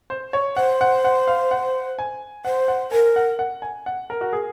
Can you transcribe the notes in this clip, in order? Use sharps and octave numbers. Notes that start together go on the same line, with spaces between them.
C5
C#5
C5 F#5
F#5
F#5
F5
F#5
G#5
C5 F#5
F#5
A#4 G#5
F#5
F#5
G#5
F#5
A#4
F#4
G#4